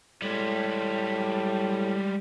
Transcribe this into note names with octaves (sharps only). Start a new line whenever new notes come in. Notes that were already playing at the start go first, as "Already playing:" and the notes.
A2 G3 G#3